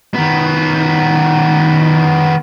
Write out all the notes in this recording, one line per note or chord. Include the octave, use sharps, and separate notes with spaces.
D#3 B3